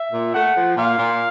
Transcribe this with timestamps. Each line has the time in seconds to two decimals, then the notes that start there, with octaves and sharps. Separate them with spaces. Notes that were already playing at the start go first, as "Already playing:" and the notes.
Already playing: E5
0.12 A#2
0.34 A3 F#5
0.55 F3
0.77 A#2 F5
0.98 A#2